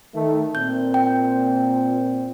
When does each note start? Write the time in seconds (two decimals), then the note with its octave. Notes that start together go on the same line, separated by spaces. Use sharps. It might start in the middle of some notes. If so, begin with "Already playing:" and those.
0.14 D#3 A3
0.55 A#2 C4 G6
0.94 G5